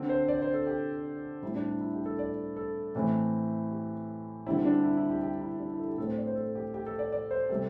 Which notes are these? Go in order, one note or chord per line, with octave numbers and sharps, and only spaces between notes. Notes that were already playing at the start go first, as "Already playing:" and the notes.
Already playing: D3 C4
C5
D5
C5
A4
G4
A2 G3 C4 E4
D4
E4
E4
G4
A4
D5
A4
A2 E3 A3 C4
G4
D3 G3 C4 E4
D4
E4
E4
G4
G4
E4
D4
E4
A4
G4
A2 A3 C4 A4
C5
D5
C5
A4
G4
G4
A4
D5
D5
C5
C3 G3 C4 A4